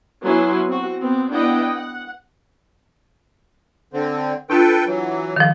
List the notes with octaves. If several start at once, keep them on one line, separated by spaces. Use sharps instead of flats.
F#3 B3 C#4 E4 B4 C6
C4 F#4
B3 C4
B3 D4 E4 D#5 F#5 G5
F#5
D3 C4
D4 F4 A4 B4 G5
E3 F#3
D#3 F3